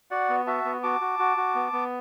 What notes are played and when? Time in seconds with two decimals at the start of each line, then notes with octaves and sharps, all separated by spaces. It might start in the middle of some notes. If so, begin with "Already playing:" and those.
0.11 F#4 D5 F#5
0.29 B3
0.47 F#4 E5 A5
0.65 B3
0.83 F#4 A5 D6
1.01 F#4
1.19 F#4
1.37 F#4
1.55 B3
1.73 B3